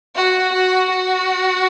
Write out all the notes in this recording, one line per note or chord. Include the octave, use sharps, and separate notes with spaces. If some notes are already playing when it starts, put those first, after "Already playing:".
F#4
F#4
F#4